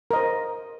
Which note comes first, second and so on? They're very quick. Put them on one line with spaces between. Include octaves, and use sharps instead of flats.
A#4 D#5 C5